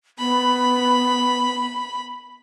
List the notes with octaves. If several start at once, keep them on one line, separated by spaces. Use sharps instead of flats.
B3 B5